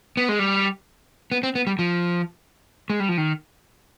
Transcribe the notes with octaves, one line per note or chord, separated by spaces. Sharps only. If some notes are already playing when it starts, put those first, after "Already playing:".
B3
G#3
G3
B3
C4
B3
G3
F3
G#3
G3
F3
D#3